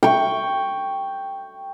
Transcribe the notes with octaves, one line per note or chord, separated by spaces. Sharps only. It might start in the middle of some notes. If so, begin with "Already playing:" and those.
G5 C#6